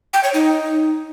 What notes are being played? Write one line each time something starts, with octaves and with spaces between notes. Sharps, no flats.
G5
C#5
D#4